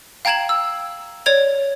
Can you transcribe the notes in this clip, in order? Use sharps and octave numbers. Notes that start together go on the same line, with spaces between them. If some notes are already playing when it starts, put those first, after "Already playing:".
F5 G5 A#5 G#6 E7 F#7
E6
C#5 D5 G#6 F7